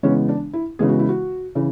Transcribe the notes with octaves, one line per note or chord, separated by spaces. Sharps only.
C#3 E3 G#3 B3 C#4
D4
E4
C#3 E3 G#3 B3 G#4
F#4
E4
F#4
C#3 E3